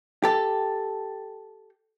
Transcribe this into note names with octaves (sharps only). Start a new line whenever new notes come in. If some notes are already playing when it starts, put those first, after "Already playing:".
G4 A4